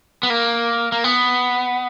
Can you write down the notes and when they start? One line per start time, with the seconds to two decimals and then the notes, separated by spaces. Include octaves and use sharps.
0.23 B3
0.30 A#3
0.92 A#3
1.04 B3